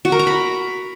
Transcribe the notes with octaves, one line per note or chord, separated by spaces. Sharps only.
F#4
A#4
A#5
B5